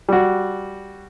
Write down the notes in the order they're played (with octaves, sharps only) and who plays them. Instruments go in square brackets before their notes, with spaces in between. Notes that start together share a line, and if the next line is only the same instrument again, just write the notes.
[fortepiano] G3 F#4